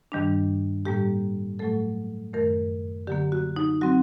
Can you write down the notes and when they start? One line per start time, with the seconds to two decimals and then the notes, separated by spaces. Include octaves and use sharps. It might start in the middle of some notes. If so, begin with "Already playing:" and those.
0.12 G2 D#3 G3 D4
0.85 A2 G3 A#3 G4
1.59 A2 F#3 A3 A4
2.34 F#2 D#3 A3 A#4
3.07 D3 F#3 A#3 G4
3.32 F#4
3.56 D#4
3.81 F#3 C4 F#4